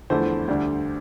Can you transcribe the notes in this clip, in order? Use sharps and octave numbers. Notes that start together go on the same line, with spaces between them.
E2 D3 F3 A3 E4 C5
D2 D3 G3 D4